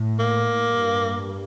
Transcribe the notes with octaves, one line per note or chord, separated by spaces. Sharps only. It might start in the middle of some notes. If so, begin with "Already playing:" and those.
Already playing: A2
A#3
G2